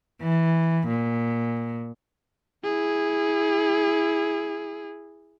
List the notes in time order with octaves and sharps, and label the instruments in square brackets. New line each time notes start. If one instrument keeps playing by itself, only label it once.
[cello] E3
A#2
[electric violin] E4 G#4